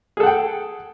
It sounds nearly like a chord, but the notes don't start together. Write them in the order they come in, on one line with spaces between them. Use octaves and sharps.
G#4 A4 F#5 G5